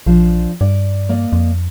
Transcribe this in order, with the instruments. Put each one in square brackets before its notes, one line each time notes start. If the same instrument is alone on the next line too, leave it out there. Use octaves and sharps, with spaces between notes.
[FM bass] A#1 [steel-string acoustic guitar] F3 D4
[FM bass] G2 [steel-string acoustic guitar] D5
[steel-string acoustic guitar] A#3 D5 D#5
[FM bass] F2